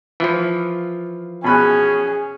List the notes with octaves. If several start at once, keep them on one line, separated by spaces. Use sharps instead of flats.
E3 F3 F4
B2 C#4 G#4 B5 F#6